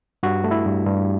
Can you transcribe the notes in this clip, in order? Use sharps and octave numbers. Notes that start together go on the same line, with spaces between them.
G2 F#4
A3
E4
G2
G2